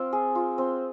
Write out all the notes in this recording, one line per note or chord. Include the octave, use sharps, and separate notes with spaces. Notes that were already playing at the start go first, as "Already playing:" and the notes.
Already playing: C4 F4
G#4
F4
C4